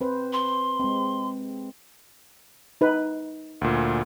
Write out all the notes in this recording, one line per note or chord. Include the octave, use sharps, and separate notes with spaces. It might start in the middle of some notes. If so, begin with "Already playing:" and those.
C4 B4 C5
C6
G#3 C4
D#4 B4
D2 A#2